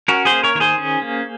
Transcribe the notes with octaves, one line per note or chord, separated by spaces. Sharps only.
C#4 F#4 A#4
G#4 C5
A#3
A#4 C#5
D#3 C#5
G#4 C5
C#4
A#3